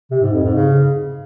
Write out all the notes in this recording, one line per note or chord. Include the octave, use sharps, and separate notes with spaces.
C3
G#2
F2
G#2
C#3